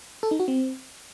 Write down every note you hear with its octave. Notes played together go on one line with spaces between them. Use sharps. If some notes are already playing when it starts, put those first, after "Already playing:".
A4
D#4
F#4
C4